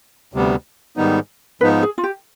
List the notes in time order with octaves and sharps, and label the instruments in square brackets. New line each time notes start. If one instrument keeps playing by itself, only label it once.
[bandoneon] D2 C3 G3 B3
G#2 D#3 G3 B3 D#4
[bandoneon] G#2 F3 B3 D#4 [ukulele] B4
[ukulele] G#4
F4
G4